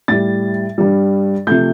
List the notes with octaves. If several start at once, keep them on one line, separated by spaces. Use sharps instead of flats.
A2 G3 A6
G2 G3
C3 F3 A3 G6